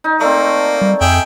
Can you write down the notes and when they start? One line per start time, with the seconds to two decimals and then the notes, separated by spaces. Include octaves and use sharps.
0.04 D#4
0.21 A3 A#3 C4 D5
0.82 G3
1.01 F2 G#4 E5 G5